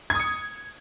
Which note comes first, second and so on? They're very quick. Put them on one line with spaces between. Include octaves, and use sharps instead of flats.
G#6 D#6 C#7